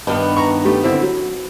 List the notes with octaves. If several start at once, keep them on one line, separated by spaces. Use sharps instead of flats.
G2 D#3 B3
A#5 C#6
G3 A3 G4
D3 C4 E4
F#3